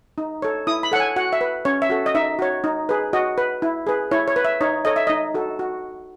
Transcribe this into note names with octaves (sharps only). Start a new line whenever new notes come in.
D#4
A4 C#5
E4 D#6
B5
A4 C#5 F#5 G#5
F#4 F#5
E5
B4
C#4 C#5
E5
F#4 A4
D#5
D#4 E5
F#4 C#5
D#4
G#4 B4
F#4 D#5
B4
E4
G#4 B4
E4 C#5
C#5
B4
E5
D#4 C#5
A4 C#5 D#5
E5
D#4 D#5
F#4 A4
F#4